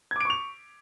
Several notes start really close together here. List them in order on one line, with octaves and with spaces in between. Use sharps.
G#6 D6 D7 C#6 F7